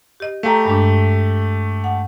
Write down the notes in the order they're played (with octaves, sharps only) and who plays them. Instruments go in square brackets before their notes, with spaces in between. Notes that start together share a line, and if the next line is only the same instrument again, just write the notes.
[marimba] G4 D#5
[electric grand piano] A3 G4 [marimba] F5 A#5
[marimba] G2 G#3 D4
F#5